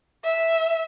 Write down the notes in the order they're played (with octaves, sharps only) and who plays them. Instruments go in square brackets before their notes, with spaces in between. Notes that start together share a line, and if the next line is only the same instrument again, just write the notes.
[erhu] E5